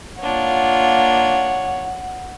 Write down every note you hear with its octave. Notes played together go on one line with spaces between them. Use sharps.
A#3 D4 F4 C#5 F#5